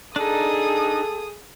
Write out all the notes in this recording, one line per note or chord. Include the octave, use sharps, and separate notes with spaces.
D4 D#4 G#4 A4 D#6